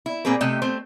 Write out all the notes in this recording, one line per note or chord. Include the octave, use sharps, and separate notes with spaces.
E4
A#2 A#3 C4 G#4 B4
C3 A3 G4 D#5
A3 C4 C5